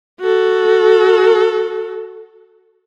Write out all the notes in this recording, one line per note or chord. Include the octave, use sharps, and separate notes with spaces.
F#4 A4